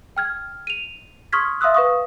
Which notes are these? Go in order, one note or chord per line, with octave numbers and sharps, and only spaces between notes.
G5 F6 G#6
D#7 F7
C6 C#6 D#6 F6 G#6 B6
E5 F5 C6 D#6 E6 F#6
B4 F5 C#6 D#6